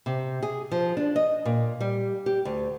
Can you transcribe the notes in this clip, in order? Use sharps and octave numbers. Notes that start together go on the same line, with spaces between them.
C3
G#4
F3
D4
D#5
A#2
G3
G4
D2